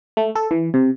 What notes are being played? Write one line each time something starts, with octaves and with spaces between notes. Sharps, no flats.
A3
A4
E3
C3